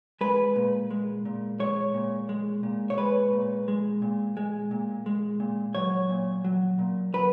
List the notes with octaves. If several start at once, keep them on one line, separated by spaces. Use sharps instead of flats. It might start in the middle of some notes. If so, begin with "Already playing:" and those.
G#3 B4
A#2
G#3
A#2
G#3 C#5
A#2
G#3
A#2
C#5
G#3 B4
A#2
G#3
A#2
G#3
A#2
G#3
A#2
F#3 C#5
A#2
F#3
A#2
F#3 B4